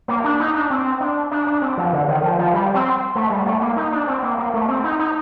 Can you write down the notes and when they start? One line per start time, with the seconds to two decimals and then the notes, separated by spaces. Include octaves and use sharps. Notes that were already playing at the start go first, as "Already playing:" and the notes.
0.08 A#3
0.24 D4
0.40 D#4
0.54 D4
0.70 C4
1.01 D4
1.31 D4
1.47 D4
1.62 C4
1.78 F3
1.93 D3
2.08 D#3
2.23 F3
2.39 F3
2.54 G3
2.74 C4
3.15 A3
3.30 G3
3.46 A3
3.61 A#3
3.76 D#4
3.92 D4
4.07 C4
4.22 A#3
4.38 A#3
4.54 A3
4.68 C4
4.84 D#4
4.99 D#4